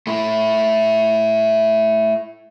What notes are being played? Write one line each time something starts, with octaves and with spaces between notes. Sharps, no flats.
A3 E4